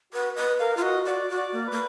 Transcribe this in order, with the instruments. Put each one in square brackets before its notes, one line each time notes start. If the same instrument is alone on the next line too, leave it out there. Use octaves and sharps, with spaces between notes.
[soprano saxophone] F#4 [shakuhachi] B4
[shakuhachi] B4 [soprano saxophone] D#5
[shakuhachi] A#4 [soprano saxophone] F5
[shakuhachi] F4 [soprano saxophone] F5
[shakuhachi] F#4 [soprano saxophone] D#5
[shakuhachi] F#4 [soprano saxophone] D5
[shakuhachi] F#4
[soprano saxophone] D5
[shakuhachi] A#3
[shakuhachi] A#3 [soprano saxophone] B4